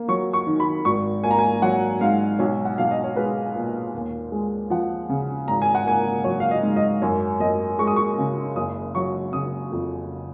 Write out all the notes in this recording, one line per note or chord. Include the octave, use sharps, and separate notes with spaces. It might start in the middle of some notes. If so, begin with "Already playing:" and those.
Already playing: A#3
F#3 C#6
C#6
D#3
B5
G#1 C#6
A#3 G#5
A#5
G#5
F#3 F#5
G#2 F5
B1 C#5
F#5
B1 F5
D#5
C#5
G#3 B4
A#2
D#2
G#3
F3 F#5
C#3
G#1 A#5
G#5
F#5
A#3 G#5
F#3 C#5
F5
D#5
G#2
D#5
F#2 C#5
F#2 D#5
G#3 C#6
D#6
C#6
C#3
F#1 D#6
F#3 C#6
C#3 D#6
F2